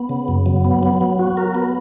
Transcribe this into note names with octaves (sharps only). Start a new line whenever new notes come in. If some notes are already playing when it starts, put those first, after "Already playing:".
Already playing: B3
C#3
F#2
F#3
B3
B3
F#3
F#4
A#4
B3